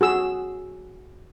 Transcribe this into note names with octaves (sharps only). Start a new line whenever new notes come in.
F#4 G#4 E6